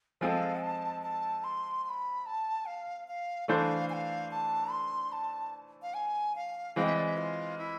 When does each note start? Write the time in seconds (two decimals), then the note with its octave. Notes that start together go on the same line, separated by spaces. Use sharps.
0.21 F3 G#3 C4 F4 A4 F5 G#5
0.62 A5
1.03 A5
1.44 C6
1.84 C6
1.89 B5
2.26 A5
2.66 F5
3.08 F5
3.48 E3 A3 D4 A4 C5 F5
3.89 G#5
3.93 F5
4.31 A5
4.71 C6
5.12 A5
5.82 F5
5.94 G#5
6.35 F5
6.76 E3 G#3 C4 F5
6.86 E5
6.96 D5
7.06 E5
7.17 F4
7.58 E4